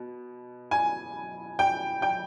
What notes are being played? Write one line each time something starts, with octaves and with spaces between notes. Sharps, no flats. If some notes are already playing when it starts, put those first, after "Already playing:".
Already playing: B2
G#5
G5
G5